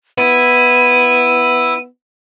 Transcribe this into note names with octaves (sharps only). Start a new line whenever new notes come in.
B3 E4 D#7